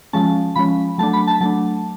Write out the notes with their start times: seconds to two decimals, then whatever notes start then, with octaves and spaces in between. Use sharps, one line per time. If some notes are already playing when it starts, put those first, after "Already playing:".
0.13 F3 G#3 C#4 A5
0.56 F3 G#3 C#4 B5
0.98 F#3 A3 D4 A5
1.13 B5
1.27 A5
1.41 F#3 A3 D4 A5